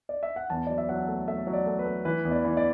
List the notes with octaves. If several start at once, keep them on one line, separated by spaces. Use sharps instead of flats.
D5
E5
F#5
E2 A5
F#3 D5
E5
F#3 F#5
A3
A3 E5
F#3
D5
A3
B4
A3
E3 B4
E2
D5
E3
D5